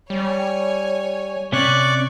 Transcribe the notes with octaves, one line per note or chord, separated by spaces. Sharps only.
G3 C#5 G#5
C3 C#4 D5 C#6 F#6